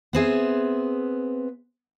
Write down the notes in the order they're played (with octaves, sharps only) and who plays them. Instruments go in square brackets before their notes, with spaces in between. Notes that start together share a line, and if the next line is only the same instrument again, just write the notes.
[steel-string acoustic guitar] B3 C4 G#4 E5